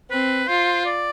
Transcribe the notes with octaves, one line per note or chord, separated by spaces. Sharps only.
C4 B4
F4 C5
D5